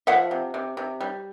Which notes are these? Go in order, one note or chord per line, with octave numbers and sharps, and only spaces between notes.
F3 E5 F#5
C3
C3
C3
G3